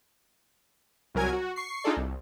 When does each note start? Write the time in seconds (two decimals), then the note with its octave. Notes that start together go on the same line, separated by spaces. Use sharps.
1.15 C2 F#3 A#4 G#5 G#6
1.33 F#4
1.56 C#6 C7
1.84 D4 D#4 F4 G#4 A4 D5
1.97 C2